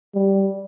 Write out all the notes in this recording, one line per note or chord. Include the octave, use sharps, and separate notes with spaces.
G3